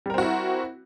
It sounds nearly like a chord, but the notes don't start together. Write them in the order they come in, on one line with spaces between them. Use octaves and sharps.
G3 A#4 C4 F#4 E4